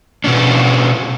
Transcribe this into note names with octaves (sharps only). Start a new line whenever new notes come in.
B2 C#4 D4